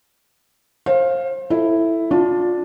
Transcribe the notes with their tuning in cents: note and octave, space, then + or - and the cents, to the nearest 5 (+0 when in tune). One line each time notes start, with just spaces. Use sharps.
C5 +30 F5 +0
E4 +0 A4 +0
D4 +0 F4 +25